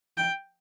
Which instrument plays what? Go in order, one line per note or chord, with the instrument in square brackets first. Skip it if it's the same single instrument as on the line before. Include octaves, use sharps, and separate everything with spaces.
[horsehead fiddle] G5